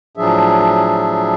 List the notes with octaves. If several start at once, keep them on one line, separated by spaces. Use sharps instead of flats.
A2 F3 F#3 D4 G#4 E5